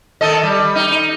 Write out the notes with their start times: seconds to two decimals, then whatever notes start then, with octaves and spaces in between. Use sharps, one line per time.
0.21 D#3 A4 D#5
0.43 G3
0.75 D#4